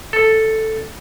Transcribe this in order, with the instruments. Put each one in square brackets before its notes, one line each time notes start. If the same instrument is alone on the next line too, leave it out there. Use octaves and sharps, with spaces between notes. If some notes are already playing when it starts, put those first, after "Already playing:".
[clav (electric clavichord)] A4